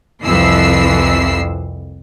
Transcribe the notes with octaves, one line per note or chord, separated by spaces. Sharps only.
C2 F2 E3 E6 C7